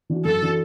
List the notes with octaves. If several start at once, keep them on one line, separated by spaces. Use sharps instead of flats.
E3 D4 F#4
F#2 A4
E3 D4 F#4